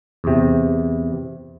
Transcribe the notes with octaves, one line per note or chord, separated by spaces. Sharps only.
E2 C3